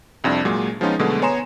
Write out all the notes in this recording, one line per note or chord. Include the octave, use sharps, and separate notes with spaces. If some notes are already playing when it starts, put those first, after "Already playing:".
C2 F2 D4
A#2 F#3 G#3
F3 G#3 B3 C#4 D#4 F4
B2 D3 F#3 G#3 A3
B3 C#5 G#5 A#5 C6 E7